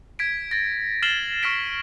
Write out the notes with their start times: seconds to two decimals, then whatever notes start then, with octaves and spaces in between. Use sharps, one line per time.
0.19 G#6 B6 D7
0.51 A6 A#6
1.02 F6 A6 C7 E7 F#7 G7
1.42 C#6 F6 A6 B6 D7 G7